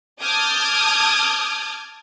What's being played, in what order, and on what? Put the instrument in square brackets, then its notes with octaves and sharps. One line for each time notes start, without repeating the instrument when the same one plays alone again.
[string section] A5 D6 D#6 F6 G6 G#6